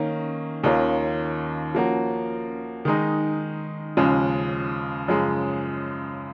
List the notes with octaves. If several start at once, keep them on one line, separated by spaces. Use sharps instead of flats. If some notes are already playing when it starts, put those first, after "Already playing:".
Already playing: D#3 A#3 C#4
D#2 D#3 A#3 C#4 F4
F3 A#3 C#4 F#4
D#3 G#3 D#4
D#2 C#3 F3 G#3
F#2 C#3 F3 G#3